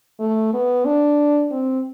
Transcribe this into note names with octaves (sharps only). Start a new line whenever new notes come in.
A3
B3
D4
C4